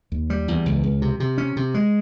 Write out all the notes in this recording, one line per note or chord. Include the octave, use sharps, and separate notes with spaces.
D#2
G3
E2
C#2
C#2
C3
C3
C#4
C3
G#3